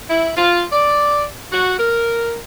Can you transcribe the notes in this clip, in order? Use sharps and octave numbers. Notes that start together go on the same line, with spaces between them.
E4
F4
D5
F#4
A#4